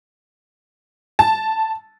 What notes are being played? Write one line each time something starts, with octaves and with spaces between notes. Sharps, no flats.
A5